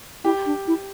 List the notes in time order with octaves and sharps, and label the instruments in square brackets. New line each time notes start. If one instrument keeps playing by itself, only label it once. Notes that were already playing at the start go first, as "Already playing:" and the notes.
[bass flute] E4 [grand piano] G4
[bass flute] D4
E4